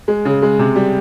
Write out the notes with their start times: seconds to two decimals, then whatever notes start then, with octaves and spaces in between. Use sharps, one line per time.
0.08 G#3
0.25 C#3
0.42 G#3
0.59 C3
0.76 G3